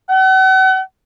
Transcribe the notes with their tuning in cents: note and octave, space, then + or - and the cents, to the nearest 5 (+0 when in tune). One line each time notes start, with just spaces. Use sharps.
F#5 +40